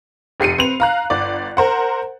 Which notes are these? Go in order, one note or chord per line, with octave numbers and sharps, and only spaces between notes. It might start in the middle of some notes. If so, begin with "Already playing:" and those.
F1 G4 C7 C#7 D#7
C4 B4 F7
F5 A#5 F#6
G1 D5
A#4 C5 F#5